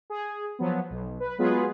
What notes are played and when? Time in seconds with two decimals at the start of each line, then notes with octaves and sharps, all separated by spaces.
0.10 G#4
0.59 F3 F#3 B3
0.90 B1
1.20 B4
1.38 F#3 G#3 B3 F4 G#4 B4